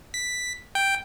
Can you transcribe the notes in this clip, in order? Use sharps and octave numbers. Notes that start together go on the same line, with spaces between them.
B6
G5